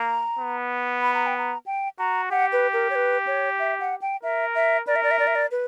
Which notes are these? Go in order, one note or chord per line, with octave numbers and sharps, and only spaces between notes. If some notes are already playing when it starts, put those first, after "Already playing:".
Already playing: A#3 A#5
B3
B5
A#5
G5
A#5
G5
F#4 A#5
G4 F#5
B4
A#4
C#5
B4
C#5
E5
F#5
G5
A#4 E5
E5
A#4 D5
E5
D5
E5
D5
E5
D5
B4